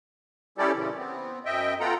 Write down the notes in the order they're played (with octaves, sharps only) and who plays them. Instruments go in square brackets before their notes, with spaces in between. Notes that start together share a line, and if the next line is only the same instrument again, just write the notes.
[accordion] G3 C#4 E4 G4 A4 D5
A#2 C#3 E3
B3 C4
F#2 D#5 E5 G5
B3 F4 A4 F#5 G5 A#5